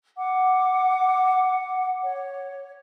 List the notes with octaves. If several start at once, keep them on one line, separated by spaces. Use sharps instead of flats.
F#5 D6
C#5